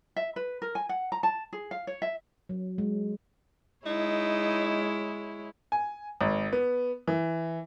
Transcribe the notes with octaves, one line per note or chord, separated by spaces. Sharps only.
E5
B4
A#4
G#5
F#5
A#5
A5
G#4
F5
C#5
E5
F#3
G#3
G#3 D#4 E4 C#5
G#5
G#1
B3
E3